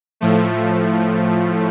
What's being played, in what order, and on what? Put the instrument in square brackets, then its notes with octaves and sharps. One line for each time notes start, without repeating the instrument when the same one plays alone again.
[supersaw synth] A2 F3 A3